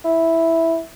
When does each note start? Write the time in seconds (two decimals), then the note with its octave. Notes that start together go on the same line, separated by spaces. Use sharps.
0.05 E4